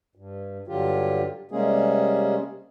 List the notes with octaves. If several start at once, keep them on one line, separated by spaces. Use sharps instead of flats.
G2
G2 D3 F#3 F4 G4
C3 G3 G#3 A#3 C#4 G#4